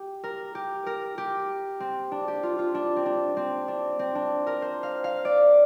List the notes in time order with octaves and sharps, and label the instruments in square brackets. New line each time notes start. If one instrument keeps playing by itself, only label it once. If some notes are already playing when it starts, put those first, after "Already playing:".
Already playing: [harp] G4
A#4
G4
A#4
G4
C4
D4
G4
F4
F4
D4
C4
D4
C4
D4
C4
D4
A#4
C5
F5
F5
D5